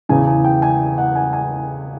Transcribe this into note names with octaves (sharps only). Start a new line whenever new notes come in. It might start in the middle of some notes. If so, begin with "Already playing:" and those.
E2 C#3 E3 G#5
G#5
G5
G#5
F#5
G#5
G#5